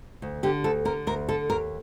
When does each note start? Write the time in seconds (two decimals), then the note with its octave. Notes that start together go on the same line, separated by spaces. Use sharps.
0.22 D2
0.43 D3 G4
0.64 D2 A4
0.85 D3 A#4
1.07 D2 A#4
1.29 D3 A4
1.50 D#2 A#4